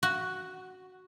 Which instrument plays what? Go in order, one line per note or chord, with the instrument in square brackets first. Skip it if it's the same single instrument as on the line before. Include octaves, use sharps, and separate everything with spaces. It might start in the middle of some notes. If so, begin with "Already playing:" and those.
[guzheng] F#4